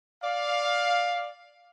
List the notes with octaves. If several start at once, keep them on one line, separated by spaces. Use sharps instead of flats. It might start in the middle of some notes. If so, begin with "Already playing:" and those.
D5 F5